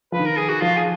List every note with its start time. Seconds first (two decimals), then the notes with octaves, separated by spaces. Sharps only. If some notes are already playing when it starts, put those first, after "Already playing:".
0.12 F3 B4
0.19 D#3
0.25 A#4
0.37 G#4
0.49 F#4
0.61 F3 F4
0.77 G#4